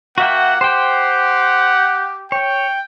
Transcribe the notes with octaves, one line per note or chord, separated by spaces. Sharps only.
A#3 F#4 E5 F#5 G5
G4 C5 F#5 G5
C#5 G5